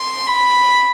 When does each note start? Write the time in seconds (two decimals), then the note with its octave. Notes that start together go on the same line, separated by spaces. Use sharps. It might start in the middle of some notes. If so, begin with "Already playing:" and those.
Already playing: C6
0.27 B5